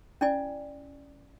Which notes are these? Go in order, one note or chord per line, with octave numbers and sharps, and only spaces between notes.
C#4 E4 D5 G#5